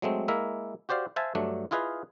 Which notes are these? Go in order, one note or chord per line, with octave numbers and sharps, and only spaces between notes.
F#3 G#3 A3 C4
G#3 A#3 E4 A#4 E5
F#4 G4 C5 D5 F5
C5 E5 F5 G#5 A5
G2 F#3 A3 D4
E4 F4 G#4 B4 D#5 F5